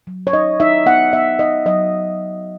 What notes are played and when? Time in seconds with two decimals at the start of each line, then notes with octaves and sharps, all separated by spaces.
0.07 F#3
0.27 C#5
0.33 D#4 D#5
0.60 D#4 E5
0.86 B3 F#5
1.13 B3 E5
1.39 D#4 D#5
1.66 F#3 D#5